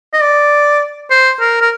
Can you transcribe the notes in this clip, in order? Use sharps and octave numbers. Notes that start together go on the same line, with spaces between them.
D#5
D5
C5
A#4
A#4